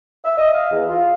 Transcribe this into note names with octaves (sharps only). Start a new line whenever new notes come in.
E5
D#5
F5
E2
F4